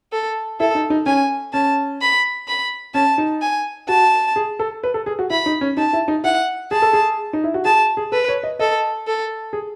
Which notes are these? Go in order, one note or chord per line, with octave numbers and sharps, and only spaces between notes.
A4
E4 A4
D#4
D#4
C#4 G#5
C#4 A5
B5
B5
C#4 A5
D#4
G#5
F#4 A5
G#4
A4
B4
A4
G#4
F#4
E4 B5
D#4
C#4
D#4 A5
E4
D#4
E4 F#5
G#4 A5
A4
G#4
D#4
E4
F#4
G#4 A5
G#4
A4 B4
C#5
D#5
A4 D#5
A4
G#4